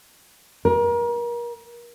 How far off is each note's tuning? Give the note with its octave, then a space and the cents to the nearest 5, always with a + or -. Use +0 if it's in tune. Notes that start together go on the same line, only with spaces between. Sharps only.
A#4 +35